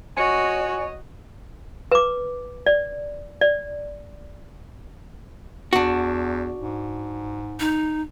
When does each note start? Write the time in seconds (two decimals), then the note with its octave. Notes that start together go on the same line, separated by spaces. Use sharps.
0.17 F#4 C#5 D#5 G#5 C#7
1.92 B4 D6
2.66 D5
3.41 D5
5.73 E2 D4 F#4
6.59 G#2
7.60 D#4